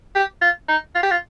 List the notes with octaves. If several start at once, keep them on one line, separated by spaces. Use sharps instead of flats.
G4
F4
D#4
F4
G4
F4